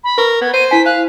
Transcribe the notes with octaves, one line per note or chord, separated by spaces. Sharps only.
B5
A#4 B4 C#6
B3 G#6
C5 D#7
E4 G#5 B6
F5 F#6